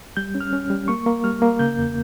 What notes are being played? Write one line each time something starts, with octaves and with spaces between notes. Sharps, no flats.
G3 G6
C#4
F6
C#4
G3
A#3 C#6
A#3
G3 F6
A#3
C#3 G6
E2